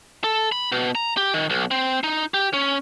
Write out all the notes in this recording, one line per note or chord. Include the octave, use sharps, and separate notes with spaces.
A4
B5
B2
A#5
G4
D#3
B1
C4
D#4
G4
C#4